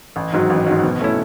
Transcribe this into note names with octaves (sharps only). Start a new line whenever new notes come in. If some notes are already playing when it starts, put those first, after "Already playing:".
A1
G#2 D#3 F#3
A1
G#2 D#3 F#3
B2
A3 C#4 E4